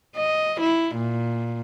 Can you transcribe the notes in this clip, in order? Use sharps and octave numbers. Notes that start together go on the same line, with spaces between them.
D#5
E4
A#2